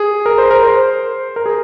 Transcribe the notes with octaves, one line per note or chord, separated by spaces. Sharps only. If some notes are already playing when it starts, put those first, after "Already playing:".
Already playing: G#4
A#4
C5
A#4
C5
A#4
G#4